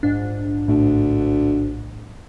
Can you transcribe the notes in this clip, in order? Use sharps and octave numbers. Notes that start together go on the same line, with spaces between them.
A#1 G#2 D4
D2 A2